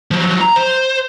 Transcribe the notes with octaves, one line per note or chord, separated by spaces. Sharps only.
F3 F#3
A#5
C5